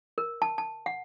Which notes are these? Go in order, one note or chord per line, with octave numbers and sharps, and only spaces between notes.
A#4
A5
A5
F#5